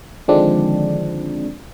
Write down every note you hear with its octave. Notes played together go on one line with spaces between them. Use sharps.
D3 D#3 F3 G#3 C4 D4